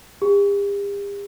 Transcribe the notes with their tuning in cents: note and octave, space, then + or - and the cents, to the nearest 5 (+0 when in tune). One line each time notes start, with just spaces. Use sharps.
G4 +45